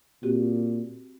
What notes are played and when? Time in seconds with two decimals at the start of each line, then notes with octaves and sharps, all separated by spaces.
0.23 A#2 C4 F#4 G4